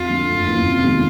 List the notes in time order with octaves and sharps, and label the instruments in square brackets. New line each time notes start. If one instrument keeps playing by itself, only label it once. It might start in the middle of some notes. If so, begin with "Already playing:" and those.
Already playing: [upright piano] F2 [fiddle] F4
[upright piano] D3 F3 A3
F#1
E2 C#3 F3 A#3
C3
D#3 G#3 B3 D#4